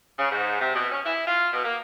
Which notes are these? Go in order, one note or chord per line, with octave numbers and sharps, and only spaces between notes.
C#3
G#2
C3
B2
C#4
E4
F4
B2
A#3